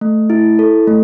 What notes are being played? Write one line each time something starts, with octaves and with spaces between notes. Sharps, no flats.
A3
E4
A4
A3